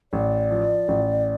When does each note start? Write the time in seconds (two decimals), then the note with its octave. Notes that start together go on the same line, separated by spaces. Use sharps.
0.13 A1 D5
0.50 F3
0.88 A1